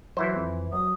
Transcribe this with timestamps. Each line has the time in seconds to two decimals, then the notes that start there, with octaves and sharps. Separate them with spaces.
0.17 E3 F#3 E4 C5
0.36 F2
0.73 F#3 D#6